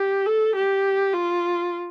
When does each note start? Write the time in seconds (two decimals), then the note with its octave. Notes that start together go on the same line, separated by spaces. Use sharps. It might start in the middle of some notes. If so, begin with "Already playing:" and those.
Already playing: G4
0.26 A4
0.55 G4
1.13 F4